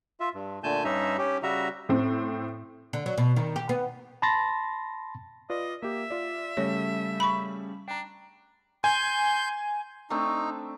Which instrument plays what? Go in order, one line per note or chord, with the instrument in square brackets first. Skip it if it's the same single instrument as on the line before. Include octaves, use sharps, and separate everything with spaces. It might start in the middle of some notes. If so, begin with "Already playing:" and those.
[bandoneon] F4 E5
G2
A#2 D3 A3 G#5 A5 G6
G2 G3 C#4 D#4 E5 A#5
C#4 G4
C#3 G3 F#4 E5 A#5
[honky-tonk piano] A2 C4
[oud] D3
F#3
B2
D#3
G4
B3
[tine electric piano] A5 B5 C6 A6 A#6
[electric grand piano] F4 B4 D5 [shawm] D#5
[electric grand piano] A#3 G4 [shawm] E5
[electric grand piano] F4 D5
[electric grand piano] C#3 G3 A3 [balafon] C#5
[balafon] B5 C#6
[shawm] D4 [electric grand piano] G5 A#5
[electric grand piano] G#5 [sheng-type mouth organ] C6 G6
[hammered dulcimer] A3 C4 D4 [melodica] D#4